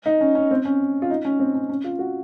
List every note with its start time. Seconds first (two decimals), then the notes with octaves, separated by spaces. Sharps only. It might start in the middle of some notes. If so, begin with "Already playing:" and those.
0.06 D#4
0.21 C#4
0.35 C#4
0.51 C4
0.65 C#4
1.02 F4
1.10 D#4
1.25 C#4
1.39 C4
1.55 C#4
1.70 C#4
1.84 F4
1.99 F#4